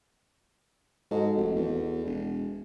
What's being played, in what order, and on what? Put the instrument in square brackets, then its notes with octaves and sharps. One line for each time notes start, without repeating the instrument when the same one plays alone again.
[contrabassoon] G#2 [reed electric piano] F#4 A4 D#5
[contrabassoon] F1
E2
E1